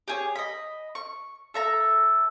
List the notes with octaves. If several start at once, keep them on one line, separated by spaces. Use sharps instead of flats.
G4 G#4 C#5
D#5 B5
C#6
A4 E5 A#5